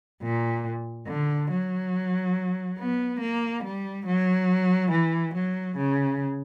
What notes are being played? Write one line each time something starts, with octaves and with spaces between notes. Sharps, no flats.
A#2
D3
F#3
B3
A#3
G3
F#3
E3
F#3
C#3